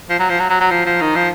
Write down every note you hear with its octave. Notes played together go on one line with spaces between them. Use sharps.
F3
F#3
F3
F#3
F#3
F#3
F3
F3
D#3
F3